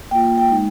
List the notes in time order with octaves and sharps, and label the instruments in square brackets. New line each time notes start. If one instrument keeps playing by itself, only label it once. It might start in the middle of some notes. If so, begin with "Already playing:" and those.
[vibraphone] A#3 F4 G5
G5
G#3 D#4